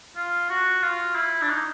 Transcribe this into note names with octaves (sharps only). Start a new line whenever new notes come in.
F4
F#4
F4
E4
D4
D#4